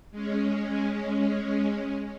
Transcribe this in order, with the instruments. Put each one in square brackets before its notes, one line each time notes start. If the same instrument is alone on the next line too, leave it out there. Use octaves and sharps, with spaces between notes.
[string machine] G#3 C#4